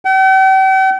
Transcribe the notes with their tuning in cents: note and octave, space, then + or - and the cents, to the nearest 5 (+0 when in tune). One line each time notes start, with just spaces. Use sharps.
G5 -45